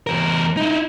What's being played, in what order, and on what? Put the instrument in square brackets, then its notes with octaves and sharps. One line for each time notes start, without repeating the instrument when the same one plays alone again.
[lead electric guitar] E2 A#4
D#4 E4